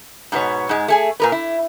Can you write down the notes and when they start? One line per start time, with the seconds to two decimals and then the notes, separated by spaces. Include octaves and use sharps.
0.32 G#2 B2 B3 C#5
0.69 G#2 G#3
0.88 A3 G#4 G#5
1.20 A#2 A#4 B4
1.32 E4